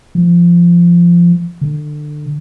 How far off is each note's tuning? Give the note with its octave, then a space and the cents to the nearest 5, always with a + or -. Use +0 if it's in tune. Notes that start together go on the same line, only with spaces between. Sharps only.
F3 -15
D3 +25